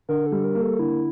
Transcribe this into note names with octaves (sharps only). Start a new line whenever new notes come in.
D3 A#4
A4
G3
A#4
A#3
A4
D3 E4